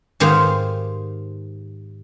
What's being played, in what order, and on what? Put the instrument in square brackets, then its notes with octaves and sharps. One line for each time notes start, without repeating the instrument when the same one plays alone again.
[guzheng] G#2 D#3 G4 G#4 C5 F5